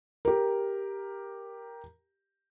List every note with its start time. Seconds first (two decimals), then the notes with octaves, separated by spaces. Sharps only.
0.25 G4 A#4